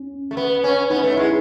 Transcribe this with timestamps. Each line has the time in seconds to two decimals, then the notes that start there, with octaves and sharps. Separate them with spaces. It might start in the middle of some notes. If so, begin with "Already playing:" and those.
Already playing: C#4
0.31 A3
0.37 B3
0.64 C#4
0.90 B3 D#4
1.04 A3
1.17 G#3 E4